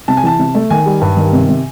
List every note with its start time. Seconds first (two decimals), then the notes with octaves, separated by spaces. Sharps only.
0.08 C3 A5
0.17 G#5
0.23 E3 A5
0.39 C3
0.55 A3
0.70 D#3 G#5
0.86 G3
1.01 G2
1.17 D#3
1.33 C3
1.49 C3